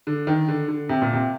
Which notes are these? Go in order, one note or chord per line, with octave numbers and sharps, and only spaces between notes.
D3
D#3
D3
D3
C3
A#2
C3